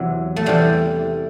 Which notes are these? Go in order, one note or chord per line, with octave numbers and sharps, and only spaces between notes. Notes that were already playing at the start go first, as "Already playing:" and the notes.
Already playing: E2 C3 E3 F#3
A3
E2 C3 E3 G3